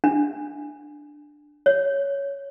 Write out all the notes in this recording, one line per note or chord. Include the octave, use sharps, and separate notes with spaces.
D4
C#5